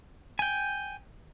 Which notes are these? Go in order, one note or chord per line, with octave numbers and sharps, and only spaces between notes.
G5 G#5